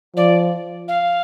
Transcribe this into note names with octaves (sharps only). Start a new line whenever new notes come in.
F3 D5
F5